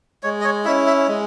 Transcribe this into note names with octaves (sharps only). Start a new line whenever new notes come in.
G#3 C#5
D#5
C#5
C#4 E4 E5
E5
G#3